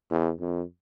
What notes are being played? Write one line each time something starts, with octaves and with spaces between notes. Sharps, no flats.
E2
F2